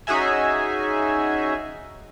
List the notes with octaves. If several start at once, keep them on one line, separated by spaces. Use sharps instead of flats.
C#4 D#4 F#4 G#4 E5 G#5